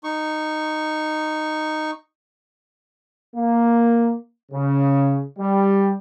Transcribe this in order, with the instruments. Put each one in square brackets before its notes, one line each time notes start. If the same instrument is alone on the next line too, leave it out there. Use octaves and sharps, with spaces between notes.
[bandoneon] D#4 C#6
[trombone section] A#3
C#3
G3